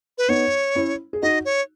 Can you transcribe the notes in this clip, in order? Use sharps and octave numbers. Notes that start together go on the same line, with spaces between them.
B4
B3 D#4 C#5
C#4 E4
G#4
D#4 F#4 D#5
C#5